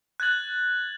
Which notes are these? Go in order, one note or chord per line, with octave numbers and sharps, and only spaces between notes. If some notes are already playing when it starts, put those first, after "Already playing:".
F#6 G#6 A6 F#7